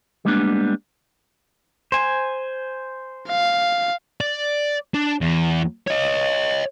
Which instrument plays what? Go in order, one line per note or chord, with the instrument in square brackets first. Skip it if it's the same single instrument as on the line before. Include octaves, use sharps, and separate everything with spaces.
[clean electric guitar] G3 G#3 A#3 B3 C#4 D4
[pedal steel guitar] C5 G#5
[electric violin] F5
[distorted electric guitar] D5
D4
E2
C#5 D#5